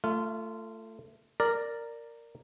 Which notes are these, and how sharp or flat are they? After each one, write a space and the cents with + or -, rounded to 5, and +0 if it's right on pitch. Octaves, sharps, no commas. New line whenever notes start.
A3 +20 F4 -15
A#4 -10 D5 +0